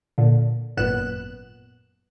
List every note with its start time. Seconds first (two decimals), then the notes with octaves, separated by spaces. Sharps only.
0.18 A#2 D3
0.77 G#1 F#2 A#2 B3 F#6 E7